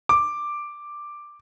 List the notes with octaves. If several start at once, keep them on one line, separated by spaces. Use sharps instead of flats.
D6